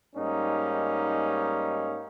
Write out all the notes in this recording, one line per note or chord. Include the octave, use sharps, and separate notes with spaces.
G#2 G3 A#3 C#4 D#4